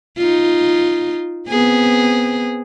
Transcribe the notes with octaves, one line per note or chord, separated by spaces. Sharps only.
D#4 F4
B3 C4 G#4